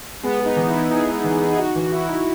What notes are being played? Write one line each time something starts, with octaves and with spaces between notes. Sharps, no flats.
G#3 B3
G#3
D#4
E3
E4
D#4
D#4 G#4
G#3
E3 G#4
D#4
G#4
D#4 F#4
E3
E4 F#4
D#4